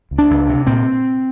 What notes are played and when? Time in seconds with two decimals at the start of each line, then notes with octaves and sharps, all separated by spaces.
0.11 C#2
0.18 D4
0.31 C#2
0.49 C3
0.67 A#2 C4